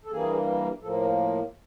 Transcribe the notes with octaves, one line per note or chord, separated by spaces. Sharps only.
A4
G2 E3 G3 A#3 G#4
A2 F3 A#3 A4
A#4